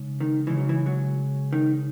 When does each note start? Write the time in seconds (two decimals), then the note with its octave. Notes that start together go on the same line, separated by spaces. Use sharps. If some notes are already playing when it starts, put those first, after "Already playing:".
Already playing: C#3 G#3 D#4
0.21 D#3
0.47 C#3 E3 G#3 C#4
0.58 F#3
0.69 E3
0.86 F#3
1.53 D#3